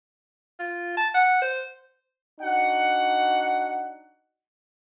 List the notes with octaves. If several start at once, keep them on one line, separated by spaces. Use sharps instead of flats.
F4
A5
F#5
C5
D4 D#4 F#4 F#5